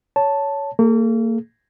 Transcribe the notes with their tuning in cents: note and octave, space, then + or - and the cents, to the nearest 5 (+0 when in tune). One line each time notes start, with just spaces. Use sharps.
C#5 +15 A5 +0
A#3 -35 G#4 +25